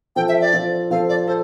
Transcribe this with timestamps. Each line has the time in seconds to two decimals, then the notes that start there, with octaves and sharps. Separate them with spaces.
0.16 F3 C4 F4 A4 G5
0.29 E5
0.41 D5
0.53 F3 C4 F4 A4
0.90 F3 C4 F4 A4 F5
1.09 D5
1.27 A4 C5